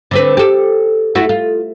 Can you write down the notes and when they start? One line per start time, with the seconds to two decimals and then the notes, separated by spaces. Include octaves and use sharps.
0.11 D3 C4 B4
0.37 G4 A4
1.15 A3 E4 F#4
1.29 F4